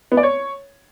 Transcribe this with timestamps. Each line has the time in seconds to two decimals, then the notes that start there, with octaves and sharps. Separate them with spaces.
0.12 B3
0.17 D5
0.23 C#5